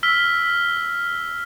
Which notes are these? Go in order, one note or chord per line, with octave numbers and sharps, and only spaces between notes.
E6 F6 B6 G7